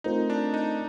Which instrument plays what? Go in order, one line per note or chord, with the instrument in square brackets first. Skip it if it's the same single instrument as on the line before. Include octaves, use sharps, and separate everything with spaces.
[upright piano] A3 C4 F4 A#4 [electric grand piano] D#4
[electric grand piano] D4
D#4